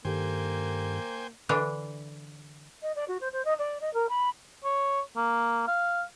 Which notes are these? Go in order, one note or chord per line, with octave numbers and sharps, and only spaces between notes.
G2 D#3 A#3 G4 A4 C5 G5 G#5
D3 E3 D4
D#5
D5
F#4
C5
C5
D#5
D5
D#5
A#4
B5
C#5
A#3
F5